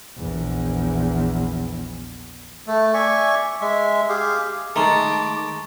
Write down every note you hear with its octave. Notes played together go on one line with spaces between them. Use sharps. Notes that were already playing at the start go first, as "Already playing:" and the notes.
A#1 E2
A3
D5 E5 G#5 C#6
G#3 E5
G4 G#4 F5
D#3 G#3 A3 A5 A#5 C#6 D6 A6